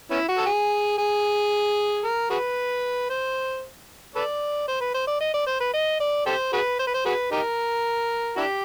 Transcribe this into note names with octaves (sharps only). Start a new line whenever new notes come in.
B3 C#4 E4
F#4
A4
G#4
G#4
A#4
F#4 G#4 B4
C5
A4 B4 D5
C5
B4
C5
D5
D#5
D5
C5
B4
D#5
D5
G4 A4 C5
F#4 G#4 B4
C5
B4
C5
F#4 G#4 B4
D#4 G4 A#4
D4 E4 G4